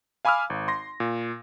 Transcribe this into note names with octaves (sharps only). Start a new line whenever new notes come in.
F5 G#5 B5 D6 E6 F6
G#1
C6 A#6
A#2